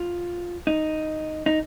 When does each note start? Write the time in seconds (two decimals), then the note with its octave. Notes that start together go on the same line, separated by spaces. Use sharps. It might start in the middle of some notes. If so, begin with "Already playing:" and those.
Already playing: F4
0.67 D#4
1.46 D#4